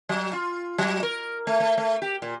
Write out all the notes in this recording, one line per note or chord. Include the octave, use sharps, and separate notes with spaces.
F#3
F4
F#3
A#4
A3
A3
A3
G4
A#2